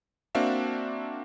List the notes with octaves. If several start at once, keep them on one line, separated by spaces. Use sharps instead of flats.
A#3 C4 D4 F#4 E5 F5